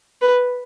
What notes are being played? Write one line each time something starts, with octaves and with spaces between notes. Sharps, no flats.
B4